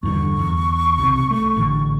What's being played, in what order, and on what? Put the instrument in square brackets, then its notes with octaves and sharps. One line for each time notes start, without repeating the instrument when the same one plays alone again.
[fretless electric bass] E2 G2 D3 [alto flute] C#6
[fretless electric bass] E2
B1 C3
A3
A1 D3